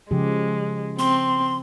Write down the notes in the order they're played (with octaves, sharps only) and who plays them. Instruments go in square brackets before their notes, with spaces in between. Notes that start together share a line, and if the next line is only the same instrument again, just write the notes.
[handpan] C#3 F3 G4 [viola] G#3
[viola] C4 [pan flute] C6